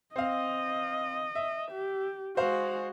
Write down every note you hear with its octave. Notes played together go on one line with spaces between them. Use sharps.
C4 D#5 F5
E5
G4
G#3 F#4 C5 F5 C6